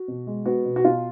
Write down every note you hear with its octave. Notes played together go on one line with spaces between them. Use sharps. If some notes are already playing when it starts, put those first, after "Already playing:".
Already playing: F#4
B2
G#3
B3 F#4
B2
F#4
B2 F4